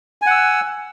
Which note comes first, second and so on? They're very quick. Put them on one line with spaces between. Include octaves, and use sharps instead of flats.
G#5 F#5 E6